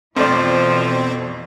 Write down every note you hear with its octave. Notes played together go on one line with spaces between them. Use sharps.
F2 B2 E3 F3 A3 C4 D5